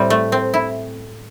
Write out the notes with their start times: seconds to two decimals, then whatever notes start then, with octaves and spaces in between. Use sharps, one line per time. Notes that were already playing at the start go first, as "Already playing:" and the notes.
Already playing: A2 G3 C4
0.10 A3
0.32 C4
0.54 E4